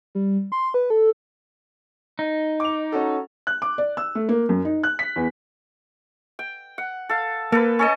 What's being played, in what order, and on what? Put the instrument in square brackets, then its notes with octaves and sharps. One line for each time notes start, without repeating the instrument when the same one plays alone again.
[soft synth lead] G3
C6
B4
A4
[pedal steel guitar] D#4
[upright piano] D6 F7
C#4 F#4 A4
[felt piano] F#6
D6
D5
E6
A3
A#3
F#2
D#4
F#6
B6
E2
[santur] G5
F#5
A4 F5
[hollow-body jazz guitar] A#3 [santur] A4 B4
[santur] C#4 A4 D#5